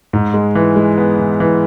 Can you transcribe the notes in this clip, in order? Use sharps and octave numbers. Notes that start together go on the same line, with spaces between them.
G#2
G#3
E3
G#3
B3
E3
E3